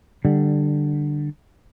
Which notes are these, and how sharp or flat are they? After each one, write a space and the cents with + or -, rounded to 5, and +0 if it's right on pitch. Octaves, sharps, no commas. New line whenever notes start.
D3 +15 G3 +0